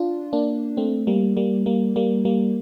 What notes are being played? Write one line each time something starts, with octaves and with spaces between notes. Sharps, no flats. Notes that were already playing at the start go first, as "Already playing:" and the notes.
Already playing: D4 F4
A#3 D4
A3 C4
G3 A#3
G3 A#3
G3 A#3
G3 A#3
G3 A#3